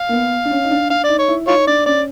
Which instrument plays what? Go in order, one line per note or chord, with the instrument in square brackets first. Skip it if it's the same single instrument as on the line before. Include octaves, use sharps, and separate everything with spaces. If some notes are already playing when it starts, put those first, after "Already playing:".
Already playing: [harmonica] F5
[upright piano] A#3
B3
D4
C#4
D#4
D4
[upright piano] D4 [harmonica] F5
[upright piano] D#4 [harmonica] D5
[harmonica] C#5
[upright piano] E4
[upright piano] D#4 [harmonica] F4 C#5
[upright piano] D4 [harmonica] D5
[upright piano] C#4 [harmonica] D5